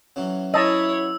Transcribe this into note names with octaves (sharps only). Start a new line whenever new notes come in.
C#3 E3 F#3
E4 C#5 D#5 A5 E6